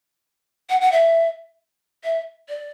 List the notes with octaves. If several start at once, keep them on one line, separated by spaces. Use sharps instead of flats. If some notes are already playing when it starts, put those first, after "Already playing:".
F#5
F#5
E5
E5
D5